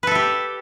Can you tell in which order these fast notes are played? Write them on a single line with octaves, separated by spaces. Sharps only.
B4 A4 E5 G4